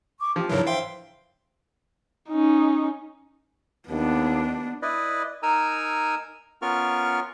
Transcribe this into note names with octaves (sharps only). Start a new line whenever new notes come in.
C#6 D6
F3 G4
G#2 C#3 E3 F#3 D4 A#4 C#5
C5 E5 F5 G5 C6
C#4 D#4
D#2 B3 D4
E4 B4 D5 D#5
D#4 A#4 G#5 A#5 E6
B3 C#4 F4 A#4 C#6 F6